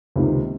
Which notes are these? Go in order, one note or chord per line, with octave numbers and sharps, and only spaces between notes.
C#2 C3 D#3 A#3 D#4